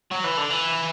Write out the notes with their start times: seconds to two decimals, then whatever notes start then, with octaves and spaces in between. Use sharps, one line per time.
0.11 F#3
0.24 E3
0.38 D3
0.51 E3